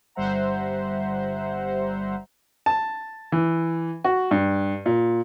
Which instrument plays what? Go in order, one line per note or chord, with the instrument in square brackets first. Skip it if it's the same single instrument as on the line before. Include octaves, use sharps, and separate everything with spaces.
[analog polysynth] G1 G3 C5 E5 F#5 A#5
[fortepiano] A5
E3
F#4
G2
A#2